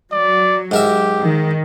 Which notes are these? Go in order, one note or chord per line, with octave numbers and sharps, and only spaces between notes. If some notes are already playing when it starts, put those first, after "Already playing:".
F#3 D5
G#2 G4 A#4 E5
D#3